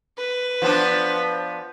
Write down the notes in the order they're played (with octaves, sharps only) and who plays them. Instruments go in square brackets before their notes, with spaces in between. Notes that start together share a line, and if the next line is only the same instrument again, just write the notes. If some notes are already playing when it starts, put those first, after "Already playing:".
[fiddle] B4
[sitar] F3 B3 D4